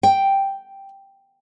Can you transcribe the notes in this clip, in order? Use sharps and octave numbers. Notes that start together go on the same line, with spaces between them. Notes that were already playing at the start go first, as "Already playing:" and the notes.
G5